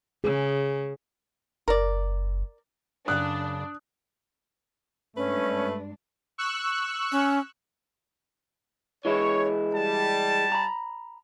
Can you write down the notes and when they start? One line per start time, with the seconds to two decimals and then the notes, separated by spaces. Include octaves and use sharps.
0.24 C#3 G#4
1.68 F#1 A#4 D5
3.08 F#2 A#2 C#3 D4 D#6 F#6
5.17 G2 G#3 A3 C#4 D4 B4
6.38 C#6 E6 F#6
7.12 C#4
9.05 E3 G#3 E4 C#5
9.74 G3 A5
10.52 A#5 B5